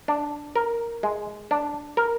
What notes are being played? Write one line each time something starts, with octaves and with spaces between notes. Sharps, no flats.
D4
A#4
G#3
D4
A#4